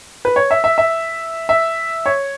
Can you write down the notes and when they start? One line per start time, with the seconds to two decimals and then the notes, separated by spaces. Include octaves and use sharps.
0.25 B4
0.36 C#5
0.51 E5
0.64 E5
0.78 E5
1.49 E5
2.06 C#5